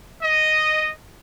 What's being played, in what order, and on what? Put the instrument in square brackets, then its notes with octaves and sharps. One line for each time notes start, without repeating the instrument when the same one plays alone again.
[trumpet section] D#5